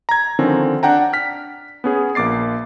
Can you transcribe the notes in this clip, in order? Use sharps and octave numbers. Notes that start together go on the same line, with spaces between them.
A#5 G#6
D3 D#3 F3 C4 C#4
D4 F#5 G5 A#5
F6 B6
B3 C#4 G#4
A#1 A#3 D6 A6 C7